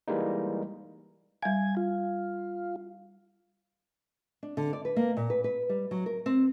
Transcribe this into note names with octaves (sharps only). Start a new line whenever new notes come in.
E3 G3 G#3 A#3 D#4
G3 F5 G#5
F4
D4
D3
D5
B4
A#3
A#2
B4
B4
G3
F#3
A#4
C4